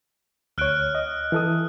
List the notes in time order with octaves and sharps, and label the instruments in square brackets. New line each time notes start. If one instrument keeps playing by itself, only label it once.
[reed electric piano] D2 C#5 [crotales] F6 F#6 D7
[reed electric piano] D#5
E3 A4 D#6